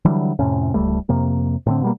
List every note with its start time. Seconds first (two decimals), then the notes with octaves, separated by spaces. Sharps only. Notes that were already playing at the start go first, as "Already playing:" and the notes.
0.05 D3 E3 F#3 G3
0.39 F2 A2 C3 C#4
0.74 D1 C#2 G3 A3
1.09 F2 C3 A#3
1.66 A2 D3 C4
1.82 B2 G3 A#3